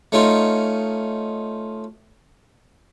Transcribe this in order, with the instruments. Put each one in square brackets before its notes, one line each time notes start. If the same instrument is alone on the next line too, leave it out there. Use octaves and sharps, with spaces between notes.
[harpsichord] A3 C#4 D#4 F4